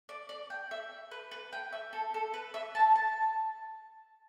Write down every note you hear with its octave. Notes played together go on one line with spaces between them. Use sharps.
D5
D5
G5
E5
B4
B4
G5
E5
A4
A4
B4
E5
A5
A5